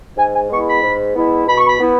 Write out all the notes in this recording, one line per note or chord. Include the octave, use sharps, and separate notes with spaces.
G#2 G#5
G#5
G#3 B3 E4 C#6
B5
G#2
G#3 B3 E4
B2 B5
C#6
B5
B3 E4